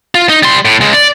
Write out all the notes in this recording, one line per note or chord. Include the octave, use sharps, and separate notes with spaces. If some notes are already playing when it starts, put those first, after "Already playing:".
F4
D#4
G3 C6
A2
C#2 G#3
D5